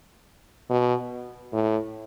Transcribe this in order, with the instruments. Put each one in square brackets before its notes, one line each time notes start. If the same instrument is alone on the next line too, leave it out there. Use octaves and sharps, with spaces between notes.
[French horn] B2
A2